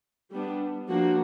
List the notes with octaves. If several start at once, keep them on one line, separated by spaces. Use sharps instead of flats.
G3 B3 D4
F3 A#3 D4 F#4